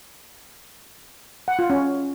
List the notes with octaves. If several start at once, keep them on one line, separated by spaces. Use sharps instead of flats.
F#5
F4
C#4